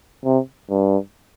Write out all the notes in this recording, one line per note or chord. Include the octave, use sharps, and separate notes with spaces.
C3
G2